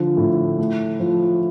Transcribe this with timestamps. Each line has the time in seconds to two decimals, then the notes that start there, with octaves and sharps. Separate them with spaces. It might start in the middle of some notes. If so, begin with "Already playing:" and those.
Already playing: D3 F3
0.17 A2
0.58 A3
1.00 F3